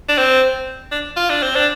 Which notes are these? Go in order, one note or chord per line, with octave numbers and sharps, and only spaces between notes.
D4
C4
D4
F4
D4
C4
D4